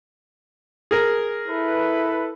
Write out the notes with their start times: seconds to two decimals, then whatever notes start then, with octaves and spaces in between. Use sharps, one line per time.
0.91 G#4 A#4
1.47 E4 A4 B4